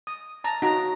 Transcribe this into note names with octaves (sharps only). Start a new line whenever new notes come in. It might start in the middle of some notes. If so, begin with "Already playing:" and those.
D#6
A5 A#5
D#4 F#4 A#5